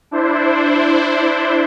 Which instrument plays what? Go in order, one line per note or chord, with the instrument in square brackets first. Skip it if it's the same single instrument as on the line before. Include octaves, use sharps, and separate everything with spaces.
[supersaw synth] D4 E4 C5